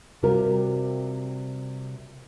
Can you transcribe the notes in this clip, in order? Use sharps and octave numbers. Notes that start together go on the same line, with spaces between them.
C3 G3 F4 F#4 A#4